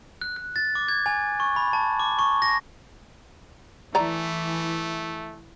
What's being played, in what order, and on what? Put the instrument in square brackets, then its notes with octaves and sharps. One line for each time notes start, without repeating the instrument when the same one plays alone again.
[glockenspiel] F#6
F#6
A6
D6
G#6
G#5
C#6
B5
A5
D6
C#6
A#6
[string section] E3 [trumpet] A3 [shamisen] D5 A#5